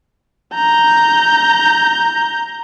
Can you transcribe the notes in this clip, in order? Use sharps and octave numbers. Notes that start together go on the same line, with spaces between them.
A#5 G6